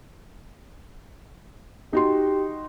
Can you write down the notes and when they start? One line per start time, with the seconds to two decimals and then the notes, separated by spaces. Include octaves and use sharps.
1.93 D#4 F#4 G4 C6